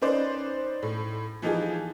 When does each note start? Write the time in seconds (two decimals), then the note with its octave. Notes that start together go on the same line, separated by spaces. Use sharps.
0.02 C#4 D#4 B4 C5 D5
0.83 A2
1.42 E3 F3 D#4 F4 G4 G#4